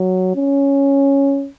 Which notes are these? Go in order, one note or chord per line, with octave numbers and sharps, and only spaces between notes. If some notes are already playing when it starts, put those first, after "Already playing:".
Already playing: F#3
C#4